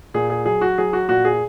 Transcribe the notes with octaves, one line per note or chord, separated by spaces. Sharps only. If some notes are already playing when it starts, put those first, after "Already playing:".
A#2 G#4
G#4
F#3 G#4
F#4
F#3 G#4
F#4
A#2 F#4
G#4